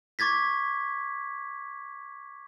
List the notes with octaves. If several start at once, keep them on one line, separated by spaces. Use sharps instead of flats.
C#6 D6 G#6 A6 B6